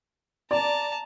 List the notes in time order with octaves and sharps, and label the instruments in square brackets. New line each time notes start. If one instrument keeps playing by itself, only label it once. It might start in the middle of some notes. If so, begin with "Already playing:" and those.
[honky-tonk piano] D5 [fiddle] A5 A#5